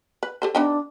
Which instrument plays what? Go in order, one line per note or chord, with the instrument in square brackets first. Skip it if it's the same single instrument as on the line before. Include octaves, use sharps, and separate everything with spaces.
[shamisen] B4
G4 A4 C5
[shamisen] B3 D#4 G4 [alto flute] D4